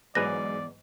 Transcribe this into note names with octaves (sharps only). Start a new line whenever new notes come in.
E2 G#2 F#3 G#3 B4 D5 G#5 A#6